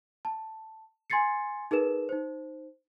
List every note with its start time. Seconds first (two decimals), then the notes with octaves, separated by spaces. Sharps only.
0.25 A5
1.10 G#5 C6 G#6 A6 C7 C#7
1.71 D#4 G#4 A#4 B4 E7
2.09 D#4 C5